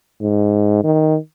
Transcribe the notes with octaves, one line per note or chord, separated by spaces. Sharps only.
G#2
D#3